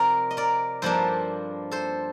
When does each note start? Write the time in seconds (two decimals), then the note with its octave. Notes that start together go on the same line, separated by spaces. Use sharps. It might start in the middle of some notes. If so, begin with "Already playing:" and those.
Already playing: C3 F3 C4 A#4 D5
0.31 D#5
0.37 A#4 D5
0.82 G2 F3 A#3 D4 A4 C5
1.71 A4 C5